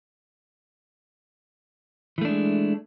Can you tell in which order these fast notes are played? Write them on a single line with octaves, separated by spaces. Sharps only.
E3 A3 D4 G#3